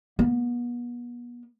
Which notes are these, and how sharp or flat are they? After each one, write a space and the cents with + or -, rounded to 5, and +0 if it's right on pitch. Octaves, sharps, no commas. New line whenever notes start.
B3 -35